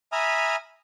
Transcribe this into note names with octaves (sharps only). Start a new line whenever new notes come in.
E5 G#5 A#5 B5 D#6 F6